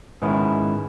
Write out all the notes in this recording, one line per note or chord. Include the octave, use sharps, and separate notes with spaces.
G#2 D#3 B3 C#4 E4